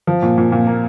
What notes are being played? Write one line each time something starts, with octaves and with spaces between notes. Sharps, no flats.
F3
A#2
A#2
A#2
A#3